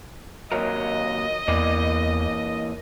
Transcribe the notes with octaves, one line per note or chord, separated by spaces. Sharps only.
D#2 F#3 A#4 D#5
E2 E3 A#3 D5